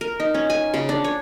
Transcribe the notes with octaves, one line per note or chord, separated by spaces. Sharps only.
A#4
D#4
C#4
G#5
C#3
D4
C#5